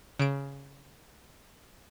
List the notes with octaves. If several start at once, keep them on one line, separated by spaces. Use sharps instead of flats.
C#3 D7